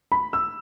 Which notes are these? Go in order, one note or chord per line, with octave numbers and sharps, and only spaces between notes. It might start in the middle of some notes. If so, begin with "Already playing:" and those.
B5
E6